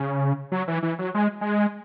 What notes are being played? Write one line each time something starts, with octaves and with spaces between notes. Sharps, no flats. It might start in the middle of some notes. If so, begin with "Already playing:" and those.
Already playing: C#3
F#3
E3
E3
F#3
G#3
G#3